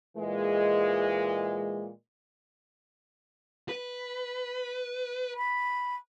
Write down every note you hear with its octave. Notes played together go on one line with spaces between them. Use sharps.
A#2 E3 G#3
B4
B5